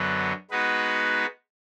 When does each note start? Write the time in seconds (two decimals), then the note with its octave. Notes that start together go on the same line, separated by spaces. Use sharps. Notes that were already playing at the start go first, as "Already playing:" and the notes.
Already playing: F#2 D3 F#3 B3
0.51 G#3 B3 D#4 F#4 B4